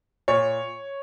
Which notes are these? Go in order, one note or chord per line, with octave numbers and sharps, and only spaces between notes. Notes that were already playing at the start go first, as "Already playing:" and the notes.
A#2 C#5